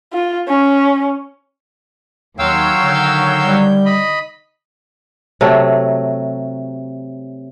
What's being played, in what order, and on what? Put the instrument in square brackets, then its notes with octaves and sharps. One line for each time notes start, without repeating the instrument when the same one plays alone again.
[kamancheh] F4
C#4
[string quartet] D#2 D#3 C6 [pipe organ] F#3 C#5 [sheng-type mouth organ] F5 G5 E6
[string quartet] D3 D#3 G6
[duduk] G3
[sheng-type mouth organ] D#5 B5
[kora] C3 F#3 A3